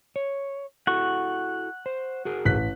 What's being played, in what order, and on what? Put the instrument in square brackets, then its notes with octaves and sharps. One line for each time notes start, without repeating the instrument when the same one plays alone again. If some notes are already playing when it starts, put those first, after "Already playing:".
[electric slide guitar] C#5
[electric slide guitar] E4 F#4 A4 [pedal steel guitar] F#5 C#6
[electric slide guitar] C5
F#4 G#4 A#4
[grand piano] A1 F#6 B6